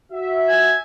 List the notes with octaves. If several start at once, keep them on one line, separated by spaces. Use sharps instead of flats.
F#4 E5
G#5